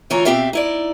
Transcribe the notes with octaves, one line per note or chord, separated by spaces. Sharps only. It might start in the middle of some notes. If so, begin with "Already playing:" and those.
D2 E3 F4 C#5 A#5
B2 F3 C4 G4 E5 F5
D#4 E4 D5